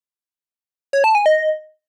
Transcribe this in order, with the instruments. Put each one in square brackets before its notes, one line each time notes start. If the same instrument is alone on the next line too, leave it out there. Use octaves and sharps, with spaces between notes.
[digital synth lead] C#5
A5
G#5
D#5